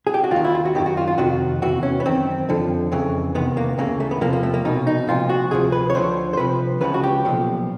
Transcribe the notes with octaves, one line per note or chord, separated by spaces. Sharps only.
G#4
G4
F#4
D#2 D#3 F4
E4
F4
F#4
F#2 D#3 G4
F#4
F4
F4
F2 C3 D#3 F#4
E2 C3 E3 F#4
C#4
B3
F#2 D#3 C4
F2 D3 F3
F2 C#3 E3
E2 C3 D#3 B3
A#3
D2 C#3 E3 A#3
A3
B3
E2 C3 F3 A#3
A#3
A3
A#3
C2 B2 D#4
D#4
C2 A#2 F3 F4
F#4
D2 C3 F3 G#4
B4
C#5
D2 D3 F3 C5
C5
C2 C3 F3 B4
C#2 C#3 F3 B4
F#4
G4
B1 A#2 F3